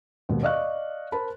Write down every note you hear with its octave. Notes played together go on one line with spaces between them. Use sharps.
D#2 G#2 B2
D5 D#5 F5 C#6 F#6
A#4 C5 A5 B5